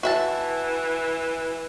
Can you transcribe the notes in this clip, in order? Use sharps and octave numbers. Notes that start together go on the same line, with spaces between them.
E3 F#4 E5 A5